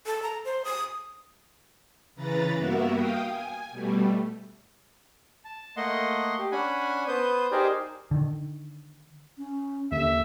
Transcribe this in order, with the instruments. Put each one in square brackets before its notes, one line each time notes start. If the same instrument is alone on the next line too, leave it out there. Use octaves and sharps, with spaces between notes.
[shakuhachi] A4
A#5
C5
D#6
[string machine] C#3 E3 B4 A#5 A6
G2 A#3 B3 F#4 A#4 E5
F5 G5 D#6
G#5
B2 G3 A3
[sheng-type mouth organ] A5
A3 A#3 D#5 F#5 C6
G4
C#4 D4 F#5 G#5 B5
B3 B4 C5 D#6 G6
D#4 G4 G#4 A#4 C5 D5
[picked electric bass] D3 D#3
[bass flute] C#4
[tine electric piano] D#2 [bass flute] D3 [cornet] E5